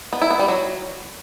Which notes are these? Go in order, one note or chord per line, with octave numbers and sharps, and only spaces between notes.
B3
E4
B3
G3
F#3